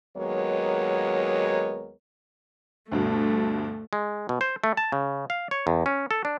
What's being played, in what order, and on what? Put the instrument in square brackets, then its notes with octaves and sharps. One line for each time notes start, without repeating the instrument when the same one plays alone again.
[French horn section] D#2 F#3 G#3 B3 A#4 C#5
[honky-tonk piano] D2 G2 B2 [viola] A3
[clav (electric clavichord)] G#3
B2
C5
A3
A5
C#3
F5
C#5
E2
C#4
A4
D4